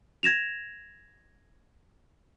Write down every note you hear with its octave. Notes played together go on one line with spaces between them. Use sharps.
G#6 A#6 E7 F7